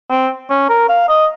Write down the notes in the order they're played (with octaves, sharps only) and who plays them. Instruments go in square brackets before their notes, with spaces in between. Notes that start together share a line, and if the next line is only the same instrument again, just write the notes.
[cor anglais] C4
C#4
A#4
F5
D#5